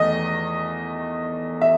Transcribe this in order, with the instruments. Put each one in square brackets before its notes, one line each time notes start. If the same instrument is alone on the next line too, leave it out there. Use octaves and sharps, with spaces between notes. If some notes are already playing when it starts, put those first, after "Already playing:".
Already playing: [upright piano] E2 D#3 A3 D#5
E5